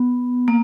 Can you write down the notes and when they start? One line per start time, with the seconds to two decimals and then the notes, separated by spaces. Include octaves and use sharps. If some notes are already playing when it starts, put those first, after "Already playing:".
Already playing: B3
0.48 A#3